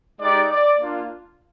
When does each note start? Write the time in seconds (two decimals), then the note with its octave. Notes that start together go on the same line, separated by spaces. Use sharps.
0.20 G#3 D#4 G4 D5
0.50 D5
0.80 A#3 D4 F4